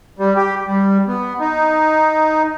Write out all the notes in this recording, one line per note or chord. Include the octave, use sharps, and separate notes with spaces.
G3
G4
G3
B3
D#4